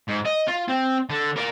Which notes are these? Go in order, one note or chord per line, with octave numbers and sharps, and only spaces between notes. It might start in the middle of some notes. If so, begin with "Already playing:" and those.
G#2
D#5
F4
C4
D3
A#4 D5